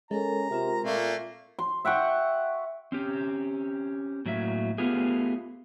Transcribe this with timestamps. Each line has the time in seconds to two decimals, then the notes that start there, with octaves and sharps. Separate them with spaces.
0.11 G#3 C#4 A4 A#4 A#5
0.50 C3 C4 F4 A#4
0.84 A#2 A3 A#3
1.59 C6
1.85 E5 F#5 G5 C#6
2.92 C4 C#4 G4
4.26 A2 F#3 A#3 E5
4.78 A3 B3 F4 G4 G#4